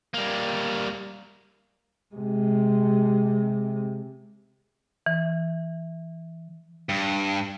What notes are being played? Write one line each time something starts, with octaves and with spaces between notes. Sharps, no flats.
G3 A#3
C3 G#3
E3
G2